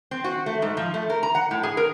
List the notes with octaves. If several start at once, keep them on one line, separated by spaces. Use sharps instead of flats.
C4
F#4
A3
G#2
F3
A3
A#4
A#5
F#5
A2
G#4
A#4